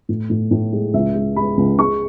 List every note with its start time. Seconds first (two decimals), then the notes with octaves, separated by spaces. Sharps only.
0.09 A2
0.30 A2
0.51 A2
0.73 G#3
0.94 C#2 E5
1.15 G#3
1.36 G#3 B5
1.57 C#2
1.79 G#3 C#6